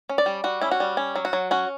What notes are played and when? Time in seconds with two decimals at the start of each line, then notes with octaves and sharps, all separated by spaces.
0.09 C#4
0.18 D5
0.26 G3
0.44 G3 F#4
0.61 C#4 E4
0.71 F#4
0.80 G3
0.97 C#4
1.16 F#3
1.25 F#4
1.33 F#3
1.51 C#4 F#4